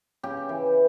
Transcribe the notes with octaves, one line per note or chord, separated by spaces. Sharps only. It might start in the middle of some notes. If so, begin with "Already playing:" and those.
C#3 G4
E3